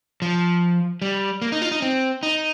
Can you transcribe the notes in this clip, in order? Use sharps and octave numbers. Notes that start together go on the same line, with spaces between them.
F3
G3
A#3
D#4
F4
D#4
C4
D#4